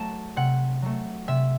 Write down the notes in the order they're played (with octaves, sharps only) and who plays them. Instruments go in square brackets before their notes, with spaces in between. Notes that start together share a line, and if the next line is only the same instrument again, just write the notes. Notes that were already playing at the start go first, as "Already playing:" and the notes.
Already playing: [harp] F#3 A3 A5
C3 F#5
F#3 A3
C3 E5